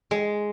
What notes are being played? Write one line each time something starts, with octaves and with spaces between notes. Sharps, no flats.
G#3